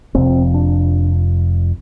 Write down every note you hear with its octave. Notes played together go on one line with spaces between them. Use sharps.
F1 F2 C3 C4
D4